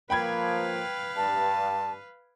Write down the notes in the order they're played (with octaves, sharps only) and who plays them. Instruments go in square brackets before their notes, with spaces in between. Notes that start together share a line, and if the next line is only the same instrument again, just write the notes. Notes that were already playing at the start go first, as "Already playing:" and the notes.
[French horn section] F3 A#3 [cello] B4 F5 [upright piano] G5 B5 G#6
[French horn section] G2 [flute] A5